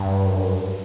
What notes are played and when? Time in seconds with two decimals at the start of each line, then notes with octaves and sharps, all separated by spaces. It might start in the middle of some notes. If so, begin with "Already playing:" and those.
Already playing: G2
0.26 F#2
0.35 G2
0.43 F#2
0.52 G2